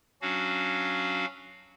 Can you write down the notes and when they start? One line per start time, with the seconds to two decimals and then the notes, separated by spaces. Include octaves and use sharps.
0.22 F#3 C#4 D4 F#4 F5